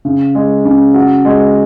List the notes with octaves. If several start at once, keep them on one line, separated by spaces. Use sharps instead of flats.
C#3
G#3
C#3
F#4
G#3